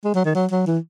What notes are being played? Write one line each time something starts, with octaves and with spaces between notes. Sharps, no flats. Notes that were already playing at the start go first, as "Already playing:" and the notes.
G#3
F#3
D#3
F#3
F#3
E3